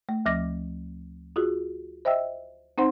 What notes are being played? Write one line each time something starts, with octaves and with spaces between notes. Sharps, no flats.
A3
D2 F3 D6 A#6
F4 F#4 G#4
C5 D#5 E5 G5 E6
C4 D#4 C5 F#5 C6